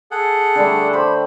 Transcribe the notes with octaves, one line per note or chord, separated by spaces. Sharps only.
G#4 A4 F#5
D3 G3 A3
G4 C5 G5 B5